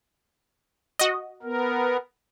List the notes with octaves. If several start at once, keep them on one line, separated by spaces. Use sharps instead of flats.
F#4 D#5
B3 A#4